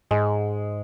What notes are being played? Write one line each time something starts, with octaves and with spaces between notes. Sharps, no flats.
G#2 G#3